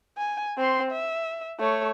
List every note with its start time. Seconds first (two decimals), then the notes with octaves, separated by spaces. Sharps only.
0.17 G#5
0.58 C4 C6
0.91 E5
1.60 A3 C#5